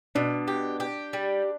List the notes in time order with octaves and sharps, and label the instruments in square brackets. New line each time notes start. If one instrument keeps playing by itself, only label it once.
[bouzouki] B2 [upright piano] D4
[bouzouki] G4
G4
G3